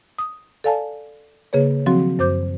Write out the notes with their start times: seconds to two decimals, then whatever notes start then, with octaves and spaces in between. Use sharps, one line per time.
0.18 D#6
0.64 A4 D5 F5 G#5 A5
1.53 C#3 A#3 G#4 B4 C#5
1.86 D#3 F3 F#3 C4 F#4
2.19 F#2 C5 D6 G6